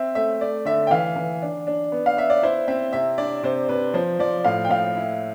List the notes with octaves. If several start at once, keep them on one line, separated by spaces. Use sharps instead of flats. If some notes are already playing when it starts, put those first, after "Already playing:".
Already playing: C4 E5
A3 E5
A3 D5
D3 E5
G5
E3 F5
E3
D4
D4
B3
F5
B3 E5
D5
E4 C5
C4 E5
C3 E5
D4 D5
C3 C5
C3 B4
F3 C5
F3 D5
A2 F5
G5
A2 F5
E4